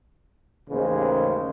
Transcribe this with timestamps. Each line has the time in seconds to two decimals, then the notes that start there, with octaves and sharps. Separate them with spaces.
0.70 A1 D#2 C#3 G#3 A#3 C5